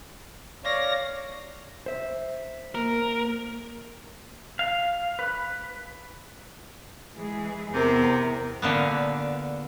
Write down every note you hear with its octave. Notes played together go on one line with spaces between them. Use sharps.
C#5 D5 F5 A#6
C5 E5
A#3 A#4
F5
B4
E3 G#3 G#4
E2 C3 B3 A#4
A#2 D3 A#3 B3